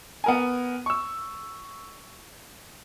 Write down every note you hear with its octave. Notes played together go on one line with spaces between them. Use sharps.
B3 A#4 G#5
C#6 E6